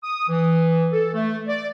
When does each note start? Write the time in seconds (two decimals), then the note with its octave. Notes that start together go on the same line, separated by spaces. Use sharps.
0.04 D#6
0.29 E3
0.92 A4
1.13 A3
1.48 D5